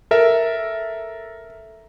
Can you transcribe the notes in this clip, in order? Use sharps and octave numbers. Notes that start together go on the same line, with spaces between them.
A4 A#4 E5